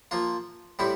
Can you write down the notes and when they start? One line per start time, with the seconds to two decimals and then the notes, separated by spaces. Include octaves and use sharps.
0.11 F3 A#3 F4
0.79 A2 G3 C4 E4